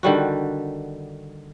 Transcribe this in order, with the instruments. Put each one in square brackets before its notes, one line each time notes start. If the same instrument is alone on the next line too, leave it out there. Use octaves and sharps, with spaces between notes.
[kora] D3 D#3 G3 F#4